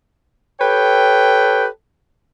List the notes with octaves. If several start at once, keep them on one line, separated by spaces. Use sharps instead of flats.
G4 A4 B4 C#5 G5